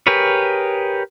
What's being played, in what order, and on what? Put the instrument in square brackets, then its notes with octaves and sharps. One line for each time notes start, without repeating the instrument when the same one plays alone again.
[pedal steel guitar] G4 G#4 A#4 B4 C#5